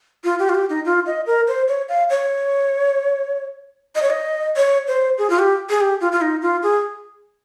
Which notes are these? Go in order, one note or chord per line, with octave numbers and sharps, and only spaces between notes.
F4
G4
F4
G4
D#4
F4
D#5
A#4
C5
C#5
F5
C#5
D#5
C#5
D#5
C#5
C5
G#4
F4
G4
G#4
G4
F4
F4
D#4
F4
G#4